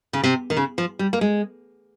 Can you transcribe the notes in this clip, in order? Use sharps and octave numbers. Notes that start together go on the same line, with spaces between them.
C#3
C3
D#3
C#3
F3
G3
A#3
G#3